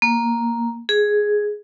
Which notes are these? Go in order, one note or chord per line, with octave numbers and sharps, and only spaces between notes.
A#3
G#4